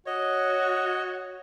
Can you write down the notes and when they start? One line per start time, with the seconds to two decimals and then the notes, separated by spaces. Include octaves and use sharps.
0.06 F#4 C#5 D#5